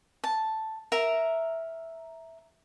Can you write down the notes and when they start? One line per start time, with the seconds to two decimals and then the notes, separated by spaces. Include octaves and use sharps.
0.24 A5
0.92 A#4 E5 A#5